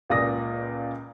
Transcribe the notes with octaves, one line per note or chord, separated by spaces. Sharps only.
C#2 A#2 D5 D#6 A#6